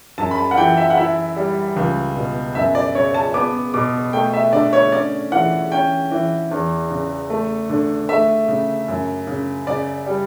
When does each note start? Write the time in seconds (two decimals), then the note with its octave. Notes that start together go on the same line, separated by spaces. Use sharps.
0.18 F#2 A5
0.31 B5
0.38 A5
0.51 F#5
0.57 E3 G5
0.77 E5
0.90 F#5
0.97 E4 E5
1.36 G3
1.76 C#2
2.16 B2
2.55 F#2 E5
2.75 D5
2.95 C#3 C#5
3.14 A5
3.34 B3 D6
3.74 B2 D6
4.13 A3 G5
4.33 E5
4.53 D3 D5
4.73 C#5
4.92 C#4 D5
5.32 E3 F#5
5.72 C#4 G5
6.11 E3
6.51 E2
6.90 C#3
7.30 A3
7.69 D3
8.09 A3 E5
8.48 C#3
8.88 F#2
9.27 C#3
9.67 C#3 D5
10.06 G3